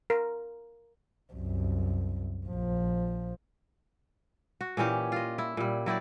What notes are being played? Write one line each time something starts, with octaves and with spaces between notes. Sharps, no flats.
A#4
C2 F#2
A#1 F3
F#4
A#2 E3 C#4 G4
F4 D#5
E4
A#2 G3
F#3 E4 G4 D5